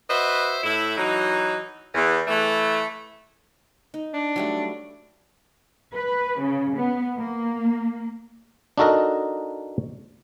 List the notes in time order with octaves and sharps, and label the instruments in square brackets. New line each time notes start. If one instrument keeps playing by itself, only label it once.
[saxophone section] F#4 B4 C5 D#5 E5
A2 E4
E3 F#3 D#4
E2
E3 A3
[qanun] D#4
[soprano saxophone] D4
[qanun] F#3 G3 A3
[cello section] B4
C#3
B3
A#3
[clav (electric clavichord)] D4 D#4 F#4 A4 A#4 D#5